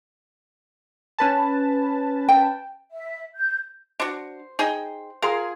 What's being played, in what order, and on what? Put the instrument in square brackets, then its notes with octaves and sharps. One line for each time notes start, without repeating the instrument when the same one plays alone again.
[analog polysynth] C#4 B4 A5
[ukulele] G5
[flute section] E5
G6
[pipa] D4 F#4 [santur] C5
[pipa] D#4 G#4 G5
[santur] F4 G#4 C6 [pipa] A#4